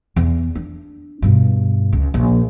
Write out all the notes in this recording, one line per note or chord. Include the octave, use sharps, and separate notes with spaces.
E2
D4
G2 B2
C#2
A#1